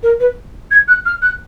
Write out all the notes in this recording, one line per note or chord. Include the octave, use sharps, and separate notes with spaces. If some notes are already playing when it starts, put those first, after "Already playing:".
A#4
B4
G#6
F#6
F6
F#6